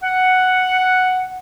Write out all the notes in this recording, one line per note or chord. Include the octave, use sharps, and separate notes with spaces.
F#5